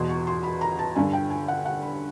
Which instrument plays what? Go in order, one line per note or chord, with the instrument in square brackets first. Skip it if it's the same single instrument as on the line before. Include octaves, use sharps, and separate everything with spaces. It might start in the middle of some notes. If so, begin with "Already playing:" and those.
Already playing: [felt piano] E2 B2 C6
C#6
C6
B5
A#5
A5
G2 D3 G#5
G5
G#5
F#5
F#5
B5